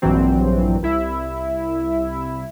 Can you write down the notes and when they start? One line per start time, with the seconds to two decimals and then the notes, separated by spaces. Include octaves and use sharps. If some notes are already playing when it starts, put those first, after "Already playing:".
0.02 A#1 G2 E3 F#3 C4
0.82 C2 E4 E5